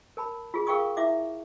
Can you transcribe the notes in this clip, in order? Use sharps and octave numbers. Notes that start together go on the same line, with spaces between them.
A#4 A5 B5
F4 G#4
G#4 A#4 F5 G5 C#6 D#6
E4 E5 D6